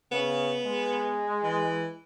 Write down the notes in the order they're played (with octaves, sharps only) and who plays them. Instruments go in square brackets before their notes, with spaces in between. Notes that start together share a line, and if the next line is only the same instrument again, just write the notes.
[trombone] C#3 [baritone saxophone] B3
[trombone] G#3
[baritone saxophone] E3